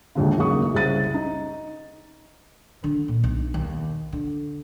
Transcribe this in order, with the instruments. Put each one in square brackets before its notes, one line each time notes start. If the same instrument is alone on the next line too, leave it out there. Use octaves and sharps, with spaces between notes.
[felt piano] A#1 D#2 G#2 D3
B1 C#3 A#3 C#6 D#6
C2 C#3 C5 A6 D#7
D#4
[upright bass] D3
A#2
B1
D#2
D3